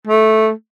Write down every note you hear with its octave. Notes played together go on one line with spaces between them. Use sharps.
A3